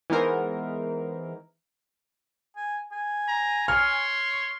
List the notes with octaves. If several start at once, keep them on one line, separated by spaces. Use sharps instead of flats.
E3 G#3 B3 D#4 A#4 C5
G#5
G#5
A#5
C#5 C6 F6